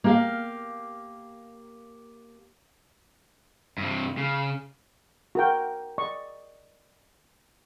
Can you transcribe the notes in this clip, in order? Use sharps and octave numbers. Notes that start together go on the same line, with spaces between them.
A#3 G4 F5
G2 C3
C#3
F#4 A#4 G5
D5 D#5 C#6